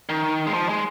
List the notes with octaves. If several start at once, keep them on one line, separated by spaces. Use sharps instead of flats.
D#3
G#3
F3
G#3